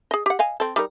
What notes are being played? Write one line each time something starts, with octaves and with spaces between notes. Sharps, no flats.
G#4 D#5
G4 F#5
D#5 F5 G#5
C4 A4
G3 D#4 A#4